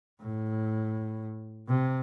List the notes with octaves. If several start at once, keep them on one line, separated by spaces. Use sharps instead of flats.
A2
C3